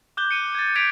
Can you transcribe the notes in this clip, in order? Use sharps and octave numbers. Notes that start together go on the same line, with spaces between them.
D6 F#6 G6 G7
C#7 D#7
G#6 A6
G6 G#6 B6 D7 F7